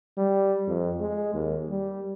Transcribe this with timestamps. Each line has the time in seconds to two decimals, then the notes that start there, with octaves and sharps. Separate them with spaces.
0.17 G3
0.68 F2
1.00 G#3
1.34 D#2
1.69 G3